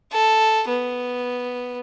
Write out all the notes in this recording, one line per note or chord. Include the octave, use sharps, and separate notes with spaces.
A4
B3